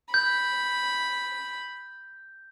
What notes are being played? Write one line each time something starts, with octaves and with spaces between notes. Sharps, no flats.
B5 G6